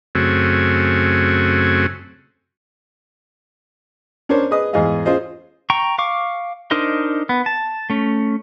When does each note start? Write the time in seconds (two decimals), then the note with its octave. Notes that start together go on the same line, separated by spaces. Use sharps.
0.15 F#2 C#3 A3 C4 F#4 G#5
4.29 C#4 D4 A#4 C5 C#5
4.51 G#4 B4 D#5 D#6
4.73 E2 G#2 G#4 D#5 F5
5.05 C#4 F4 G#4 C5 D#5
5.70 G5 A#5 C#6
5.99 F5 C#6 D6
6.71 D4 D#4 A#4 C5 D#5
7.29 B3
7.46 A5
7.90 A3 C#4